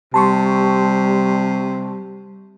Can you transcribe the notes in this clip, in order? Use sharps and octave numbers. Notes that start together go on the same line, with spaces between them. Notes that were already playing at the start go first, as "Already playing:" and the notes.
C3 G3 A5 C6 C#6